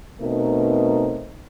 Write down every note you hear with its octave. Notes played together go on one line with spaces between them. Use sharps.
B2 A3 C4 D#4 A#4